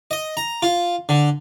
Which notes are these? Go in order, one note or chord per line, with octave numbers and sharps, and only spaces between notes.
D#5
A#5
F4
D3